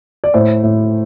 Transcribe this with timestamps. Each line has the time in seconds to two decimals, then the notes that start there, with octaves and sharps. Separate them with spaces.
0.24 D5
0.34 A2 C5
0.63 A2